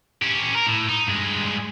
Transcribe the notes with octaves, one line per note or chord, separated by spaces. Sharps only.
C#4 G4
A#4
A2
D#4
G2 G#3